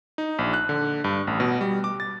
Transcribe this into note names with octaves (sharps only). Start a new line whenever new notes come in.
D#4
A#1
F#6
D3
G2
A1
B2
G3
D6
A6